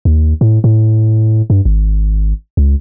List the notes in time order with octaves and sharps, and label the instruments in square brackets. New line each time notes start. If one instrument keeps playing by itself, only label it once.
[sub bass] D#2
A2
A2
G2
G#1
C#2